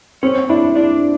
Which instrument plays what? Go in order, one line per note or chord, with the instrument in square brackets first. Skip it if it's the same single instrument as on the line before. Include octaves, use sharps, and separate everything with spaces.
[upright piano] C4 [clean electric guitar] C#4 C#5
[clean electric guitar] D4 D5 [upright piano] E4
[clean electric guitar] D4 D5 [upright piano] E4